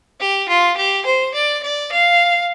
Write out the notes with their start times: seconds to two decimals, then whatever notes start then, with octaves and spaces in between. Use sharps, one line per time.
0.20 G4
0.49 F4
0.77 G4
1.05 C5
1.34 D5
1.63 D5
1.92 F5